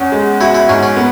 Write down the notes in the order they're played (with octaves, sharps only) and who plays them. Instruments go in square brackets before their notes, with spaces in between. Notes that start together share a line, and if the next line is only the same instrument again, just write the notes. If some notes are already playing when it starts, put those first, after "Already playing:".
Already playing: [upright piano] E2 C#4
G#3
[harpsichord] E4 [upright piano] F#4
[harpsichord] E4
[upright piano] G#2 [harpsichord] C#4
[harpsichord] C#4
[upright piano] B3